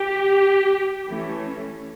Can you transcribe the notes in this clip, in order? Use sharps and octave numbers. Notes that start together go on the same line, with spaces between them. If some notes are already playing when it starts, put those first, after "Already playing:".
Already playing: G4
E3 A3 C#4